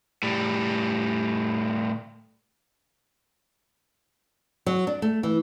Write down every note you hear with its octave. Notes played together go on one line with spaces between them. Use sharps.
A2 G3
F#3
D4
A3
E3